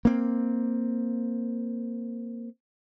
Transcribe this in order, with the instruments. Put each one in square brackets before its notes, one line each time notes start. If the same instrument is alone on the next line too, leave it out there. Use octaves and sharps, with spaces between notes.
[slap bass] A#3 C4